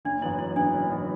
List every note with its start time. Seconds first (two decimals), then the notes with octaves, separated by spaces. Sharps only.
0.05 F#1 D4
0.22 F#2 E3 B3 E4
0.39 F#1 E4
0.56 F#2 E3 B3 D4
0.73 F#1
0.90 F#2 E3 B3